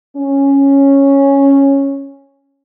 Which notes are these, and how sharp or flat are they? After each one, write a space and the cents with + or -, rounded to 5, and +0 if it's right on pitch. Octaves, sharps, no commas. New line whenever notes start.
C#4 -5